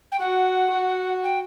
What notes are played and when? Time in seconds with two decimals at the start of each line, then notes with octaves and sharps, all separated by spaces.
0.12 G5
0.19 F#4 F#5
0.72 F#4
1.23 G5